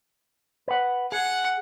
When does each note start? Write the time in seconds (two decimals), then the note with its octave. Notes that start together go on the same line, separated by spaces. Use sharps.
0.68 B4 F#5
1.12 G#4 F#5